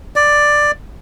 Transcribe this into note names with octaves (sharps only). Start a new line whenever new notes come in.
D5